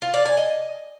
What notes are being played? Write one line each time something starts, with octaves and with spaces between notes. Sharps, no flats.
F4
D5
G#5
D#5